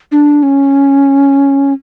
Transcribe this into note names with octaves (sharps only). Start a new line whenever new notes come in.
D4
C#4